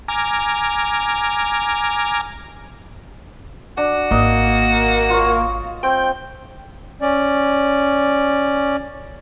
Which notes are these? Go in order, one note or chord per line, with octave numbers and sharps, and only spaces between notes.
G#5 A#5 D6 F6
D4 F#4
G#1 A#3 D#5
F4 C#5
C4 G5
C#4 D5